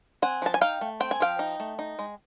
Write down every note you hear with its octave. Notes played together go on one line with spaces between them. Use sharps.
C4 F#5 G#5
F3 A5
G#5
D#4 F5 G5
A3
C4 G5
G#5
F3 F5 G5
D#4
A3
D#4
G#3